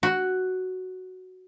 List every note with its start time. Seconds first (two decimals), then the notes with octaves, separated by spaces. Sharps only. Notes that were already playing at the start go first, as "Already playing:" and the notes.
0.03 F#4